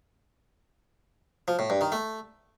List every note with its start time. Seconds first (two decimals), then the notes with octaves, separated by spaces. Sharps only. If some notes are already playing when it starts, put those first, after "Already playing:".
1.48 F3
1.59 A2
1.70 G2
1.81 D#3
1.92 A3